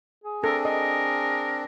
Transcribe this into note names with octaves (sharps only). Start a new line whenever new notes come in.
G#4
C4 D4 A4 A#4
A#4 D#5